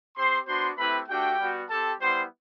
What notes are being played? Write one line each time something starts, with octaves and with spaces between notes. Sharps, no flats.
C4 G4 C5 C6
B3 D4 F#4 C5 C6
A3 C4 E4 G4 B4 B5
A3 D4 F#4 G4 G5
G3 B3 F#4
C4 G4 A4 A5
G3 B3 E4 G4 C5 C6